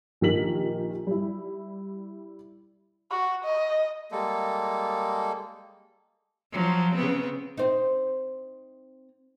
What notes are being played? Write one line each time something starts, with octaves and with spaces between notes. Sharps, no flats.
A#1 D#3 G4 A#4 B6 F#7
G3 E4
F#4
D#5
G3 G#3 A#3 A4
F3 F#3
C#3 B3 C4
C4 D#4